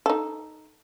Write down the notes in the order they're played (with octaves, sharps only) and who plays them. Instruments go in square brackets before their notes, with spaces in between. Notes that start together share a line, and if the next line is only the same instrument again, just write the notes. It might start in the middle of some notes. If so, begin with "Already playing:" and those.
[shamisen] D#4 A4